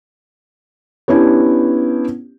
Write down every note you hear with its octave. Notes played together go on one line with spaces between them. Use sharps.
B3 C#4 D4 E4 G4